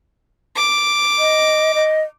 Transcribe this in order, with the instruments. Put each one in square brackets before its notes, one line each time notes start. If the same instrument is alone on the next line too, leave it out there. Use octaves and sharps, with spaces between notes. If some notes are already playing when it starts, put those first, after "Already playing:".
[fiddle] D6
[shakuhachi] D#5
D#5